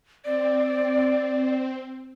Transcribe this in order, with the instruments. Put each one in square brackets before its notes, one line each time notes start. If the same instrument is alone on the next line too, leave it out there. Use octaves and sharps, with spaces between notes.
[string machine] C4 [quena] D5